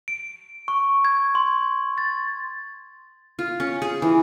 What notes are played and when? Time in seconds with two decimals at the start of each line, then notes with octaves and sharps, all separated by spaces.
0.08 D7
0.68 C#6
1.05 G#6
1.35 C6
1.98 A6
3.39 F4
3.60 C#4
3.82 G#4
4.02 E3